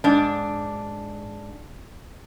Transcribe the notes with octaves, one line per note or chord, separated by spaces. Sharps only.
G#2 D4